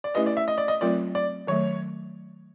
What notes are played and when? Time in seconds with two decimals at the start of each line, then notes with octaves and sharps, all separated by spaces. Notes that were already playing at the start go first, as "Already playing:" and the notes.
0.04 D5
0.14 A3 C#4 E4 G4 B4 D#5
0.26 D5
0.37 E5
0.48 D#5
0.58 D5
0.68 D#5
0.81 F#3 A3 C4 F4 A#4 D5
1.15 D5
1.47 D#3 F#3 A3 C#5